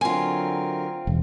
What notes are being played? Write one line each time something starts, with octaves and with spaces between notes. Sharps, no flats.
D3 F#3 C4 F4 A#4 G#5
E1